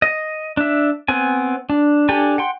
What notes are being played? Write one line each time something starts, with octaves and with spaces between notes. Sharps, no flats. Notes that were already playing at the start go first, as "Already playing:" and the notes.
D#5
D4 E5
B3 C4 G#5
D4
D4 G4 A4 G#5
F#5 G5 C6